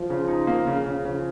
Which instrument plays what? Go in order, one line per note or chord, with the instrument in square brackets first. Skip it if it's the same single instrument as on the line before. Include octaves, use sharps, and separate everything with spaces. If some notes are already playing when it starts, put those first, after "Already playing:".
Already playing: [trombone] F3
[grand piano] C#3
D#4
A#3
C#3
[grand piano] C#3 [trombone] F3
[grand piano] C#3